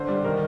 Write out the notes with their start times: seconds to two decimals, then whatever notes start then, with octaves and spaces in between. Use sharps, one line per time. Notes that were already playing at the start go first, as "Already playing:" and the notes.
Already playing: D3 C5
0.08 G3
0.24 D#3 A#4